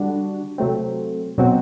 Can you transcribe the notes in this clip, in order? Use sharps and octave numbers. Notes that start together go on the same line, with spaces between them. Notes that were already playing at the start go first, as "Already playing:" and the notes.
Already playing: D3 G3 D4 F#4
C3 F#3 A3 C4
B2 F#3 C4 F#4